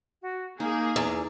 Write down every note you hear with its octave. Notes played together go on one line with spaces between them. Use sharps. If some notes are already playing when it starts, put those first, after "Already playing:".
F#4
A#3 D#4 G#4 F5
E2